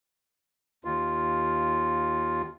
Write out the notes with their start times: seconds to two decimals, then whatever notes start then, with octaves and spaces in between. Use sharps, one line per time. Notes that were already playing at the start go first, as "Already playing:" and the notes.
0.85 D#2 F4